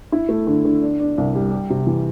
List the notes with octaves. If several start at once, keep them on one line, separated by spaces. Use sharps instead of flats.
E4
A3
D3
D3
D4
D4
C2
G3
G4
C3
E3